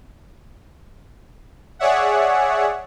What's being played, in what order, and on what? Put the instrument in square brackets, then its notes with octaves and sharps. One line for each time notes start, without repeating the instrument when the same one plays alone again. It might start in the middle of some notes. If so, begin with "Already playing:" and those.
[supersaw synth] G#4 C#5 D5 E5 F#5